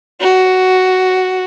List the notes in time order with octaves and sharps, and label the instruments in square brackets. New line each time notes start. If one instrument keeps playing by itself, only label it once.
[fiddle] F#4